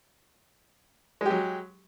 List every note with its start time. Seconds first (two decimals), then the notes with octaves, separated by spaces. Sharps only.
1.21 G#3
1.26 G4
1.30 F#3